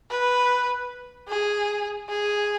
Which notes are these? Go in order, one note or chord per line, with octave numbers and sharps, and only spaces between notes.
B4
G#4
G#4